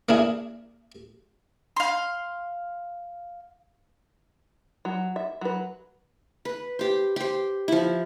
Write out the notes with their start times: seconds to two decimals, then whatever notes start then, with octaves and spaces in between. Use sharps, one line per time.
0.09 A#3 D4 E4 G#4
1.76 F5 C6
4.85 F#3
5.16 E5
5.41 F#3 B4
6.45 B4
6.79 G4 C5
7.16 G4 C5
7.68 F3 E4